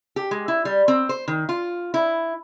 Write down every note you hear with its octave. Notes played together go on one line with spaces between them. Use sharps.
G4
G#3
E4
G3
C4
C5
D#3
F4
E4